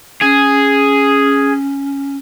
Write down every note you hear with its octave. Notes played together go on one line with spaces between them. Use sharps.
C#4 G#4